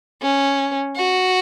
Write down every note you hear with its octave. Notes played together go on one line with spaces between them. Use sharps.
C#4
F#4